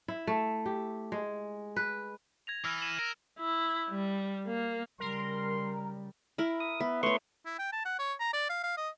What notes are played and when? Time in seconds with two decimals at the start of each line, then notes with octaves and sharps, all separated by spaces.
0.08 E4
0.27 A3
0.66 G4
1.12 G#3
1.76 B4
2.47 G#6 A#6 F7
2.65 E3 E6 F6 A#6
2.81 D#7 E7 F#7
2.99 A#4
3.39 E4
3.90 G3
4.47 A#3
5.00 C#3 G3 A#4 C6
6.38 E4 A#4
6.60 D#6
6.81 B3 E5
7.03 A3 B4 C#5 C6 C#6
7.46 E4
7.59 G5
7.73 A5
7.85 F#5
7.99 C#5
8.20 A#5
8.34 D5
8.49 F5
8.63 F5
8.77 D#5